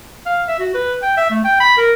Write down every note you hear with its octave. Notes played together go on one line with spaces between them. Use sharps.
F5
E5
F#4
B4
G5
E5
A3
G5
B5
A#4